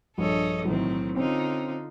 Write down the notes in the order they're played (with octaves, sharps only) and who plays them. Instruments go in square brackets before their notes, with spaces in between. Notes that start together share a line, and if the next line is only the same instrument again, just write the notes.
[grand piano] A#1 G2 [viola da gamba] A4 C#5 D#5
[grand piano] B1 E3 [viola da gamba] A2 D#3 C4
[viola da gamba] D3 D#4 F4 [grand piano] C4 C#4